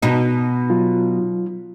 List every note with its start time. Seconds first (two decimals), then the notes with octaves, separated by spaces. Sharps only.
0.02 B2 D#4
0.70 F#3 F4